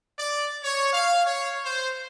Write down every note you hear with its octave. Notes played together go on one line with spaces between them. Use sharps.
D5
C#5
F5
C#5
C5